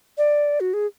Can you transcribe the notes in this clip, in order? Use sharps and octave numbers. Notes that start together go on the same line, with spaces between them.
D5
F#4
G#4